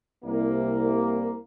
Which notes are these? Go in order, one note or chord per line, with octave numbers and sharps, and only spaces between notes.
C2 A#3